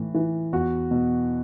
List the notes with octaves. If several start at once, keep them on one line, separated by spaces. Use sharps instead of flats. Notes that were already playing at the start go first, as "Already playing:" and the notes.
Already playing: A2 E3
E3
E2 F#4
B2